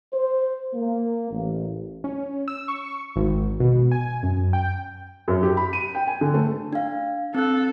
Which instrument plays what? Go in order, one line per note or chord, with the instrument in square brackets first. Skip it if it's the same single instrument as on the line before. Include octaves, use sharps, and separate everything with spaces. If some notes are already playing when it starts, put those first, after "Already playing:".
[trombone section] C5
A#3
A1
[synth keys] C#4
E6
C#6
G#1
B2
G#5
F#2
G5
[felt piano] F#2
G4
B5
D#7
G5
G#5
D3
A3
[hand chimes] D4 F5
[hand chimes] C4 F#6 [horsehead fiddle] A4